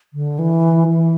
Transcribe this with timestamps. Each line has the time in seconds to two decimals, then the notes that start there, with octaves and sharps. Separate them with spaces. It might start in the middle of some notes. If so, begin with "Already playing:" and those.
0.13 D3
0.39 E3
0.89 E3